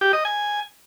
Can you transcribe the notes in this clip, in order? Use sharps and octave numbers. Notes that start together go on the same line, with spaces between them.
G4
D#5
G#5